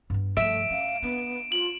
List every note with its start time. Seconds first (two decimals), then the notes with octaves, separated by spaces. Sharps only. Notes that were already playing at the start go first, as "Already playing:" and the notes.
0.10 G2 B3
0.37 G2 F3 A3 E5 D7 E7
0.70 C#4 F5
1.02 B3 D4
1.52 F4 F#7